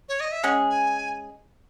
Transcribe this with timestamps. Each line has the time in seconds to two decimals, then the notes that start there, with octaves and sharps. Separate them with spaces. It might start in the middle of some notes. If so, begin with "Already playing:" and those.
0.09 C#5
0.20 D#5
0.32 E5
0.43 G#3 C#4 G#4 F#5
0.70 G#5